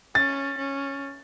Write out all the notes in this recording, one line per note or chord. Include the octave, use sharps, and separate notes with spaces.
C#4 A6
C#4